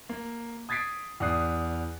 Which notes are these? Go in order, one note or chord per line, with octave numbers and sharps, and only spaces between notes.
A#3
D#6 G#6 A6 B6 C7 D7
E2 D5 D#6 F#6 C7